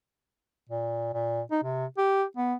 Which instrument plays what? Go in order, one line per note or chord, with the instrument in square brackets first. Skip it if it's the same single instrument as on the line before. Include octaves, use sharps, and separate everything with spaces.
[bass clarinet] A#2
A#2
D#4
C3
G4
B3